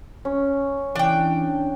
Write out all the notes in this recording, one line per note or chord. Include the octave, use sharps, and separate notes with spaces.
C#4
E3 D4 G5